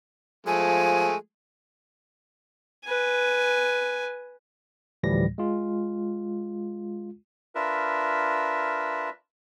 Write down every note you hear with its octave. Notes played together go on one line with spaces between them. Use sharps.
F3 G#3 A3 G#5
B4 G#5
D2 A2 E3 F3 G3 A#6
G#3 F4
D4 F4 A#4 B4 E5